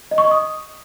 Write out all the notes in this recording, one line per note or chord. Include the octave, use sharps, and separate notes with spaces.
D#5
C#6
D#5
D#6